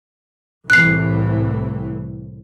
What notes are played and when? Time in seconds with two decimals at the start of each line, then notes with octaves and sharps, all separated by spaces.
0.70 C2 A2 E3 F#6 C7